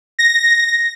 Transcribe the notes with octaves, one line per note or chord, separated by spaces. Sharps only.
A#6